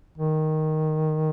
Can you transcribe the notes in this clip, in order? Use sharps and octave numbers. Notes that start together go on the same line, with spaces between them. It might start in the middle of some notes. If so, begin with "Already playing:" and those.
D#3